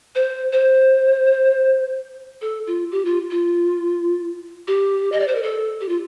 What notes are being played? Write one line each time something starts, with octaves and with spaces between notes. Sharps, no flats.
C5
C5
A4
F4
G4
F4
F4
G4
D#5
D5
C5
A#4
A4
G4
F4